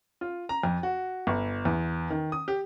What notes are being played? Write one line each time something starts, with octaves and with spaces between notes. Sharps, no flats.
F4
A#5
F2
F#4
G1
E2
D#3
D#6
G4